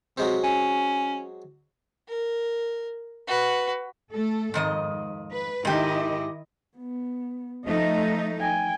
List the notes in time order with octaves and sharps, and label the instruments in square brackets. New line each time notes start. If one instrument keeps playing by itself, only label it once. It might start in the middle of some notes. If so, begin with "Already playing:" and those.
[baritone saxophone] C3 [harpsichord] F#3 G#3 C4
[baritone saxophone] C#4
[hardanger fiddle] A#4
F#4 B4
[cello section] A3 A4
[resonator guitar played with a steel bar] F2 D#3 D#5 [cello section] G#2
[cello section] B4
[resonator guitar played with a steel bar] G#2 G4 [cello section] D#3 E4 D#5
[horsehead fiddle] B3
[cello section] F3 A3 D#4 [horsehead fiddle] D#5
[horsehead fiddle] G5 G#5